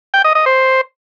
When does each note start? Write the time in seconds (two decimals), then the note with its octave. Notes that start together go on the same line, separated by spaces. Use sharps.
0.14 G5
0.24 D#5
0.35 D#5
0.46 C5